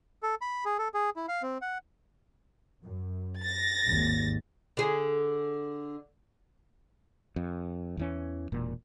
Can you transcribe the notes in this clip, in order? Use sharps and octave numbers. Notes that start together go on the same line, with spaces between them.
A4
B5
G#4
A4
G#4
E4
F5
C4
F#5
F#2
A6 A#6
G#1 D#2
D3 G#4
F2
E2 E3 C#4
E1 A#2